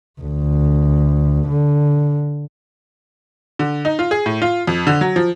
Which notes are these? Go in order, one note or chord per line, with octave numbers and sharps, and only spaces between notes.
D2
D3
D3
D#4
F4
G#4
A2
F4
F2
D3
F#3
F3